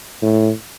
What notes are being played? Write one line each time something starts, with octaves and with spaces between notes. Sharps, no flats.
A2